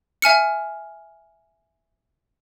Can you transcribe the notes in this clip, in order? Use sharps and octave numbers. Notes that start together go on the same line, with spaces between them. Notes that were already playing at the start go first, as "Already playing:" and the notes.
E5 G#5 F6 C#7